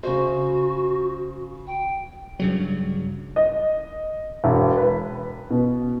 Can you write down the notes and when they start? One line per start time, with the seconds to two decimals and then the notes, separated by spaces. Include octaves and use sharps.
0.03 C#3 F#4 C5
1.67 G5
2.39 G2 C#3 F#3
3.36 D#5
4.44 E1
4.77 B4
5.50 B2